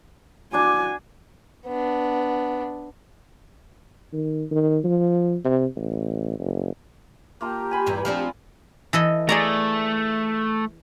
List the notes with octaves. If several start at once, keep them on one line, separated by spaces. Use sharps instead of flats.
D4 F#4 G#5 D6
B3 D4
D#3
D#3
F3
C3
A1
F#1
A#3 F4 G4 A5 A#5
G#5 B5 C6
E2 G2 E3
F3 C4 D4 F5
E3 A4 D#5
A3 G#4 D5 A#5